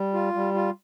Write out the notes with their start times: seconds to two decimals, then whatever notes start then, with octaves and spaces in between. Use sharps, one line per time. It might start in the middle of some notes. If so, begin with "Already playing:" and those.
Already playing: G3
0.14 F4
0.34 G3
0.54 F4